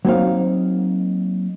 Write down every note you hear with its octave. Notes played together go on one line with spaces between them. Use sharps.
F#3 A#3 C4 D#4 F5